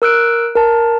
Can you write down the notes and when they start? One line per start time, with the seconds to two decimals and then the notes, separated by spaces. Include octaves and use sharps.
0.02 A#4 E6 F#6 D7
0.55 A#4 A5